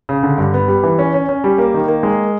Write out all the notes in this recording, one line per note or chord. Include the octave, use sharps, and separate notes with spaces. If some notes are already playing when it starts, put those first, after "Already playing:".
C#3
D3
G2
B3
G3
E3
C#4
C#4
C#4
G3
A#3
D#3
A#3
G#3